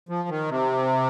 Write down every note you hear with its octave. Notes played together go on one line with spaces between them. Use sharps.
F3
D#3
C3